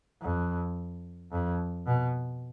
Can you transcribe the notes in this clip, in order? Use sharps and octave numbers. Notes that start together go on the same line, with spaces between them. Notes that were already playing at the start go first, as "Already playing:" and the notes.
F2
F2
B2